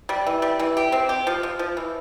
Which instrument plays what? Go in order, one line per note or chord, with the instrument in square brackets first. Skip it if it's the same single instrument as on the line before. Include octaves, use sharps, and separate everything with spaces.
[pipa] G3
E3
G3
E3
G4
C4
G4
F3
F3
F3
E3